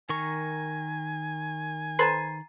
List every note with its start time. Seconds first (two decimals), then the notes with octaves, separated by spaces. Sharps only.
0.09 D#3 A#4 G#5 C#6
1.99 A4 B4 C5 A#5 A6 C7